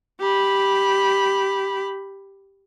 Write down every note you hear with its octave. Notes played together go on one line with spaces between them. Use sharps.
G4 B5